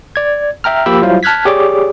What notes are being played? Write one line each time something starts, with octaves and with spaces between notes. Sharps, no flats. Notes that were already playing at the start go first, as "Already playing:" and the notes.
D5 G#6
E5 G5 A#5 F6
F3 A#3 G4 G5 B5 E6
F#3 G3 E4 F4 C5 F5
A5 F6 F#6 G#6 B6
G4 G#4 C#5 D5 D6